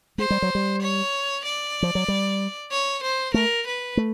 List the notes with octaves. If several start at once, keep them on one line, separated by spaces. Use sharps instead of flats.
G#3 C5
G3
F#3
G3
C#5
D5
F3
F#3
G3
C#5
C5
A3 A#4
B4
A3